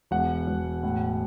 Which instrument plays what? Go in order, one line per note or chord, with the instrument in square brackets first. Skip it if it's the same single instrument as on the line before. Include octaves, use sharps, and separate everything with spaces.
[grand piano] E1 F#5
E1
A2